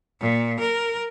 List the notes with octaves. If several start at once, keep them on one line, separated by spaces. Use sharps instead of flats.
A#2
A#4